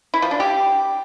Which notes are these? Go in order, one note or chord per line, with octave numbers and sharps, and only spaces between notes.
E4
F3
D4
G4